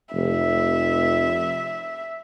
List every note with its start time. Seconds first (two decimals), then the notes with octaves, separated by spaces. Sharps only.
0.14 F1 E5